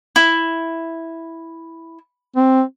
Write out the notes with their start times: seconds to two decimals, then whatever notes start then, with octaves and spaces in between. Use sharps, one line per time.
0.16 E4
2.36 C4